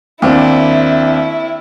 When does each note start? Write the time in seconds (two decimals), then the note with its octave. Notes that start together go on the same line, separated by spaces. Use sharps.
0.22 D#2 C4 D4 E4